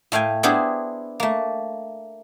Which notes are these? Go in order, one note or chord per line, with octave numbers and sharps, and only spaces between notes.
A2 A3 F5 G5 G#5
B3 D4 E4 G4 G#4 C5
A3 A#3